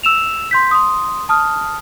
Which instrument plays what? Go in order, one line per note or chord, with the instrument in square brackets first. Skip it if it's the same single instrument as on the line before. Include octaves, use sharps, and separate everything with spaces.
[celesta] E6 E7 F7
C6 G6 B6
C6 D#6
A5 D#6 F6